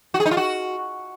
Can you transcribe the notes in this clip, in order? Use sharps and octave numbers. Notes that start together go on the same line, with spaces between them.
F#4
G#4
D#4
F4
F#4